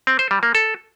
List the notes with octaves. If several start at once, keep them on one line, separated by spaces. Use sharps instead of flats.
C4
C5
G3
A#3
A4